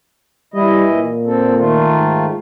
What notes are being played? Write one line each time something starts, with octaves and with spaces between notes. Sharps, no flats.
E3 G3 E4 D#5
A#2
C4 A4
D#3 A3 F4
G#2